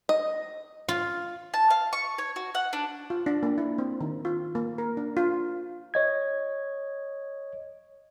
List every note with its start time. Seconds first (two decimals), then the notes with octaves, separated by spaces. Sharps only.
0.09 D#5
0.88 F4
1.54 A5
1.70 F5
1.93 C#6
2.18 C#5
2.36 F#4
2.55 F#5
2.73 D4
3.10 F4
3.26 D4
3.43 A#3
3.58 E4
3.78 C4
4.01 D#3
4.25 F4
4.55 A#3
4.78 A#4
4.97 D4
5.17 F4
5.94 C#5 D#5 G#6